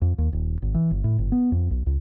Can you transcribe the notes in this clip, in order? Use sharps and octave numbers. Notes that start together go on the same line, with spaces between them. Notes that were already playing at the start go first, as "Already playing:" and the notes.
F2
D#2
D#1
G#1
E3
G1
A2
G1
B3
F2
B1
C#2